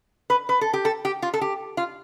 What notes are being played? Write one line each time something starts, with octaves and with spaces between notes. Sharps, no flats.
B4
B4
A4
G4
A4
G4
F4
A4
G4
F4